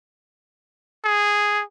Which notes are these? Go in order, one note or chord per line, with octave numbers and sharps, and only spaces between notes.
G#4